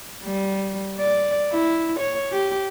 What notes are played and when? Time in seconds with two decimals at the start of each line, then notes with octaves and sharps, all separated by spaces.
0.24 G3
0.99 D5
1.52 E4
1.99 C#5
2.32 G4